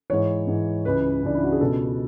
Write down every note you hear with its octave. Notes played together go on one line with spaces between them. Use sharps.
G#2 E3 C#5
G#2 E3
C#2 C#3 E3 B4
C#2 C#3 E3 D4
E4
F#4
G#4
C#2 B2 A4